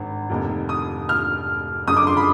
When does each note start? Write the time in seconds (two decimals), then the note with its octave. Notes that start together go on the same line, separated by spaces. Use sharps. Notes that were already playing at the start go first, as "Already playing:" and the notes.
Already playing: G#1 G2
0.30 F1 D#2 D#3
0.69 D#6
1.09 F6
1.87 F#1 F#2 D3 D#6
1.97 D6
2.07 C6
2.17 B5